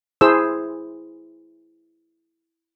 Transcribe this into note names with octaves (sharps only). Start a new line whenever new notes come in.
E4 G#4 C5 E6